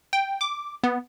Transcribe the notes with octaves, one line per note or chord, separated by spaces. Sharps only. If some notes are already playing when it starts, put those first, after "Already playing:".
G5
D6
B3